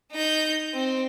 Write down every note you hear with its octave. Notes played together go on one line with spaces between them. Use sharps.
D#4 G6
C4